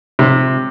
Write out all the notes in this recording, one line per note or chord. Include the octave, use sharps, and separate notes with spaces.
C3